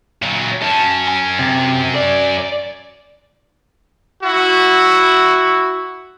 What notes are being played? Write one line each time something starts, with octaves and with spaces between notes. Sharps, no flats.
A#2 F#3
F#2 C#4 A5
G#5
C3
D5
E4 F#4